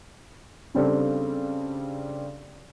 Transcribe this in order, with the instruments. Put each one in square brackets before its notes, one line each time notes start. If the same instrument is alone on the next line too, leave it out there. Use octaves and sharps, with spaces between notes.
[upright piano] C#3 G3 C4 D4 A4